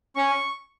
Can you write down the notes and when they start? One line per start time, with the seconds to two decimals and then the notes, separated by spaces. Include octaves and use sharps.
0.16 C#4 C#6